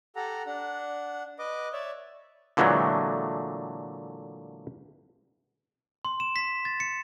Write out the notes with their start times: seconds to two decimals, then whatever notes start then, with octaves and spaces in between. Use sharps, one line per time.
0.16 G4 A4 F#5 A#5
0.46 D4 F#5
1.39 B4 D#5 D6
1.73 C#5 D5 E5
2.57 A#2 D3 E3 F#3 G#3 A3
6.05 C6
6.20 E7
6.36 B6
6.65 A6
6.80 C#7